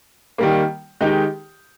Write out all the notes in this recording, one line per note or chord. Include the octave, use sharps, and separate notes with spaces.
D#3 G3 A#3
D#3 G#3 D#4 G4